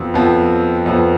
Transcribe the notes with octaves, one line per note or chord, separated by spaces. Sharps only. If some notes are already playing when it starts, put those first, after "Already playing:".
Already playing: F2 F3 B3
F2 F3 B3
F2 F3 B3